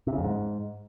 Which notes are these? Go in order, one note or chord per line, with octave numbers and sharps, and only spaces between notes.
C3
C#3
F2
G#2